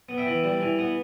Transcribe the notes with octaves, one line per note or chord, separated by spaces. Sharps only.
B3
E5 G5
E3
G3
E3
B3